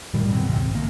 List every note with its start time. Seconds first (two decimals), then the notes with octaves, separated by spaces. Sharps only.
0.14 A2 D#3 G3
0.30 F#1 B2 F#3 C4
0.46 C#2 G#2 D#3 C4
0.61 G#1
0.75 C2 D#3 A#3